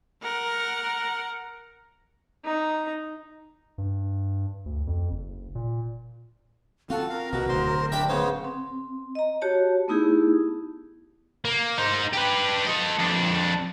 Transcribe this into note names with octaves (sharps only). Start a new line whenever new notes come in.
A#4 F#5
D#4 A#5
G2
D2
F2
F#1
A#2
C4 F4 F#4 A4
A#4 F5
C2 B2 F#4
D1 D2 C5 C6
D4 G4 E5 G5 B5
C#3 B3 C5 C#5
C4
D#5 A#5
F#4 G4 C#5 A5
A3 B3 D#4 E4 G4 G#4
A#3
D#4 C5
G4 B4
A4 D#5
F2 D4